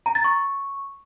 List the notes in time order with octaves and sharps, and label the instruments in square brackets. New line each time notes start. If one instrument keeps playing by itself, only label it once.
[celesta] A#5
A6
C#6